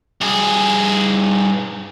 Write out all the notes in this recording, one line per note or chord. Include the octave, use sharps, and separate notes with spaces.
G2 G#4